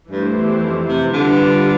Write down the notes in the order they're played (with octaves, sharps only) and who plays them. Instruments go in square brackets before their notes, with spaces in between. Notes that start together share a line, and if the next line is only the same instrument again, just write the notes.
[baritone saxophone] G2 [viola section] E3 A3 E4 G4 C5
[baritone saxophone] E2
F2
C3
[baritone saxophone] D3 [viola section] G3 D4 F4 B4